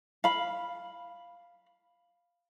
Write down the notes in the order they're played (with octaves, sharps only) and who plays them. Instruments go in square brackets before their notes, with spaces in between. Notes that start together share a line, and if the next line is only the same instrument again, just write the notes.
[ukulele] F5 B5